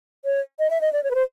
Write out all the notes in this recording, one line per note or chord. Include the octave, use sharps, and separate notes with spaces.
C#5
D#5
E5
D#5
D5
C#5
B4
C5